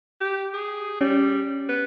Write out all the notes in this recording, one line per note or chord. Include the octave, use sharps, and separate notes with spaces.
G4
G#4
G3 C#4
B3